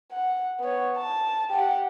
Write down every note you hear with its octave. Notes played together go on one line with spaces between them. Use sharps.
F#5
B3 C#5
A5
G4 F#5